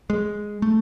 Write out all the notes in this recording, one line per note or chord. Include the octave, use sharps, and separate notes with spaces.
G#3
A3